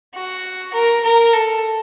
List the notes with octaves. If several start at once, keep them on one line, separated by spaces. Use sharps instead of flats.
F#4
A#4
A#4
A4